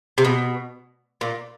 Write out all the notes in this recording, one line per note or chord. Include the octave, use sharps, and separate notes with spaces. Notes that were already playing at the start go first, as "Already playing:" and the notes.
C3
B2
A#2